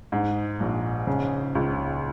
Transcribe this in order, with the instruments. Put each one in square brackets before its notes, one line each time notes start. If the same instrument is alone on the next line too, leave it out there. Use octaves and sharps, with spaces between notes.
[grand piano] G#2
A#1
C#3
C#2